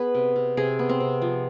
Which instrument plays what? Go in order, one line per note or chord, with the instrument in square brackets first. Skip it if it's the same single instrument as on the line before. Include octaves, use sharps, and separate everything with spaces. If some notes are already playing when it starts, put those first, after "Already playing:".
Already playing: [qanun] B3 G#4 B4
C3
C3
C3 G#4
B3
C4
C3
F3